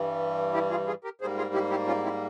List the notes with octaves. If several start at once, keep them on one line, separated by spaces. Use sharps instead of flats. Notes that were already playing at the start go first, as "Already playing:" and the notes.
Already playing: G2 E3 G3
E4 G4
F4 G#4
F4 G#4
G4 A#4
G#2 G3 A#3 G#4 C5
F4 G#4
E4 G4
E4 G4
C#4 F4
C4 E4